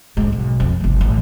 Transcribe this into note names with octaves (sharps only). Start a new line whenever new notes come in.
G#2 D3
B1
F2
G1 C2
A1